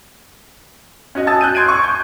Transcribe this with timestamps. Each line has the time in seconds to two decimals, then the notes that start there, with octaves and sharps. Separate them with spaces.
1.15 C#4 F#4 D#5
1.27 G#5 A5 D#6 E6 A6
1.41 F#6 G6 D#7
1.55 C6 G#6 D7 D#7
1.69 C#6
1.84 G6